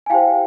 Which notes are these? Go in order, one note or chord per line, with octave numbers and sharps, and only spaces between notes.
G#5
E4 G4 C5 F5 G5